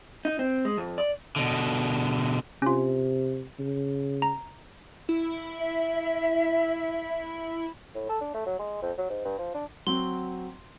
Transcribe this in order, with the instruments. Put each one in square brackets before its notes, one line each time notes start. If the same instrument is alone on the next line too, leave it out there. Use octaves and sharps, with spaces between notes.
[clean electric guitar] D#4
C4
G#3
F2
D5
[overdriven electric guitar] B2 D3
[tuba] C3 [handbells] C#4 F4
[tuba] C#3
[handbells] A#5
[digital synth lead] E4
[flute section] E5
[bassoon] A2
A4
D4
A3
F#3
G#3
F2
F#3
G#2
G2
F3
D4
[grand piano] F#3 C4 F#4 [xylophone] C6